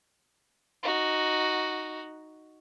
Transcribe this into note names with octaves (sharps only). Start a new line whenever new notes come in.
D#4 F#4